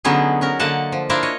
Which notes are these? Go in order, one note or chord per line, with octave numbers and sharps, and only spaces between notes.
D3 F#3 B3 C#4 D#4 G#4
C#4 F#4 A#4
D3 A#3 D#5 F#5 A5
F3
D4 E4 F4 A#4 C5 D5
C#5 D#5